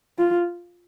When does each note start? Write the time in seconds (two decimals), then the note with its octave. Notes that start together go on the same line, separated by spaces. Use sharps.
0.18 F4